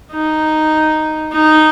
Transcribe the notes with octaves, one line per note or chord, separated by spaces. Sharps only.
D#4
D#4